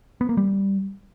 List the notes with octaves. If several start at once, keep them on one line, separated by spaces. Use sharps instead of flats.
B3
A#3
G3